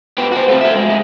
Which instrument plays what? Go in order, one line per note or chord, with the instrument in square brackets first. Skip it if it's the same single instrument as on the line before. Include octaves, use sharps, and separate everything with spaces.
[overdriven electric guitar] B3 G4
F#4 C5
A3 C4
F#4 E5
G#3
D2 G#3